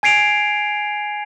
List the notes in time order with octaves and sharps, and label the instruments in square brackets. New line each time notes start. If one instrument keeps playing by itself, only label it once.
[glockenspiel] G#5 G#6 C7 D7 F7